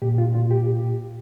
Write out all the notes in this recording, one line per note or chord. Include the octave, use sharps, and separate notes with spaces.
A#2 G4
F4
A#2 F4
G4